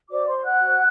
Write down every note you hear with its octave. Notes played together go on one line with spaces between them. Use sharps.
F#4 C5 D5 D6
C5 C6
F#5 F#6
F#4 C5